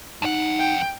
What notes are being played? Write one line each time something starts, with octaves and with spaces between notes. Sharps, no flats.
F2 D#4 F#5
G5